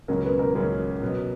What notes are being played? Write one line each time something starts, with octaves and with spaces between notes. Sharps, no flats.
C#2 C#3 F#3 A#3 C#4 A#4
B4
A#4
C#2 C#3 F#3 A#3 C#4
B2 F#3 B3